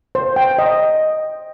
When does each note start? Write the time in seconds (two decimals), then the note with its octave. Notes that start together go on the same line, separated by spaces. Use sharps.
0.15 C5
0.36 G5
0.58 D#5